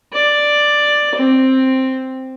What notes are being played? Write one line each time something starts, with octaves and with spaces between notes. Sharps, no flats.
D5
C4